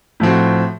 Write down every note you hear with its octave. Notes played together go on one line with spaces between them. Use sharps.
A2 F3 C4 F#4